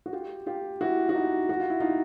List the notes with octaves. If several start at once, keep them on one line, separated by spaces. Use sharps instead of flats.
F#4
F4 G4
F4 G4
E4 F#4
F#4
D#4 F4
F#4
F4
E4
D#4 F4